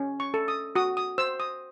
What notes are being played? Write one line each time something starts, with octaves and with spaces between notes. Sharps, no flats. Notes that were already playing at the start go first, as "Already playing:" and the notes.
Already playing: C#4
C#6
A4
D#6
F#4 D#6
D#6
C5 E6
D#6